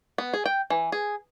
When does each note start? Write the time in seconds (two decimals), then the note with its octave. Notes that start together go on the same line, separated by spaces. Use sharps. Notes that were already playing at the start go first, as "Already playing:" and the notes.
0.18 B3
0.34 G#4
0.46 G5
0.70 E3
0.92 G#4